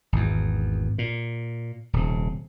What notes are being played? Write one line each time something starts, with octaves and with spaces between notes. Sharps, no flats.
G#1 E2
A#2
D#1 C3